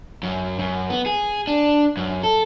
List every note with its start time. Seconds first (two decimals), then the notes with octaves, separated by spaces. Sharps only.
0.23 F#2
0.59 F#2
0.90 B3
1.06 G#4
1.47 D4
1.97 F#2
2.23 A4